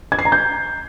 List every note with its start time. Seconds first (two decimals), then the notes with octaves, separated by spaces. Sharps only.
0.12 G#6
0.19 C7
0.25 A#5
0.32 G6